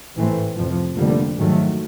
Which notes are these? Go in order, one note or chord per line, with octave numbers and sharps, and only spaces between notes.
A1 G#2 E3 A3 C4
F2 C3 F3
F1 F2 D3 G3 A#3
G#2 D#3 F#3 A3